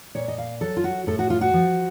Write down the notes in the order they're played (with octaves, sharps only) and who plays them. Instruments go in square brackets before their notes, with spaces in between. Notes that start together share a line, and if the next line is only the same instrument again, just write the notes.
[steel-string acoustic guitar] A#2 C#5
D#5
F5
F#3 A4
F4
F#4
A2 A4
F#4
F4
F#4
F3